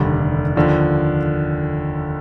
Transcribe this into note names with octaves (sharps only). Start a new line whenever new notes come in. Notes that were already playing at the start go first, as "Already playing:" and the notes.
Already playing: F1 D#2 D3 G3
D#2 D3 F3